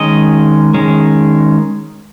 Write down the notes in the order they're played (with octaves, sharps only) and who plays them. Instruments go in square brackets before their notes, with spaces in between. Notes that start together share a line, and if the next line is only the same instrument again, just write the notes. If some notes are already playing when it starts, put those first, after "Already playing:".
Already playing: [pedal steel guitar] D#3 G#3 C#4 D#5
D#3 G#3 C#4